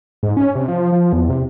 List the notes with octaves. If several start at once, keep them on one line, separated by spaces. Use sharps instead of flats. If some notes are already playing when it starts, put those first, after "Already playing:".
G#2
C#4
C3
F3
F3
E2
C3